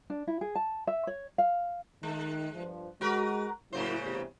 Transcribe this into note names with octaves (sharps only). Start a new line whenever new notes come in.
D4
E4
G#4
A5
E5
C#5
F5
D#3 G#3
G2 F3
G#3 F#4 A#4 B4
A2 C#3 F#3 A#3 E4 C5
E2 G2 C3